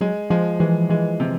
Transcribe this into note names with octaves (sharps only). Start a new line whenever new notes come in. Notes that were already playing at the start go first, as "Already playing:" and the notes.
F#3 G#3
F3 G#3
E3 G#3
E3 G#3
C3 F3